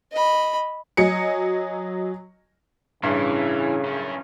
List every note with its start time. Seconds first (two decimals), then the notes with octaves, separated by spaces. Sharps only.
0.12 D#5 B5
0.97 F#3 D#5 G#5 C#7
3.03 A1 G2 C#3 E3
3.85 F#2 C#4